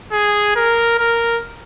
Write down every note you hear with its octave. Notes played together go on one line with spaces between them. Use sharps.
G#4
A#4
A#4